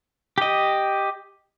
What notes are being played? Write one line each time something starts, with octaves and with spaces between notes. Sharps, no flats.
G4 D#5